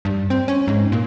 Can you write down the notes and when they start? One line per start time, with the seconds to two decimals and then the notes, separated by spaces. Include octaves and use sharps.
0.05 G2
0.30 C4
0.48 C#4
0.68 G#2
0.92 A#2